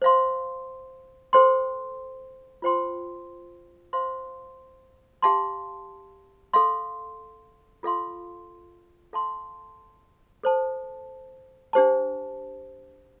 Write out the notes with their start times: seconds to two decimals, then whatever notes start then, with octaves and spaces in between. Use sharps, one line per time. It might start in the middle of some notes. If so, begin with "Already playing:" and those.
0.02 C5 F5 C6
1.33 A4 C5 G5 C6
2.62 F4 C5 G5 C6
3.93 C5 F5 C6
5.22 G4 F5 A5 C6
6.53 A4 F5 C6
7.83 F4 A4 F5 C6
9.13 A4 F5 A5 C6
10.43 A4 C5 A5
11.73 D4 G4 C5 A5